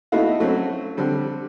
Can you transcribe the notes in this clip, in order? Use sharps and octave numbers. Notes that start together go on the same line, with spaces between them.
A3 B3 D#4 E4 F#4 F5
F#3 A3 C4 C#4 F#4
D3 G3 C4